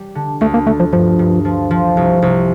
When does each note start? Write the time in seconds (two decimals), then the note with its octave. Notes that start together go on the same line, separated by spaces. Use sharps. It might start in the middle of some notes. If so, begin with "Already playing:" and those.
Already playing: G3
0.15 D3
0.41 D2 A3
0.54 A#3
0.67 D3 A3
0.80 F3
0.92 G2 F3
1.19 G2
1.45 F3
1.71 F3
1.97 C2
2.22 C2